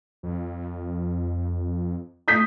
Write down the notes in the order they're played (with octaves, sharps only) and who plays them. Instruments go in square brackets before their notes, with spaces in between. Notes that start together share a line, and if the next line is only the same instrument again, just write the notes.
[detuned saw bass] F2
[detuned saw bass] A3 [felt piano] D#6 G6 B6